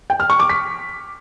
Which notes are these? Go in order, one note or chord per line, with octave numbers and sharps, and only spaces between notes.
G5
F6
C#6
D6
B6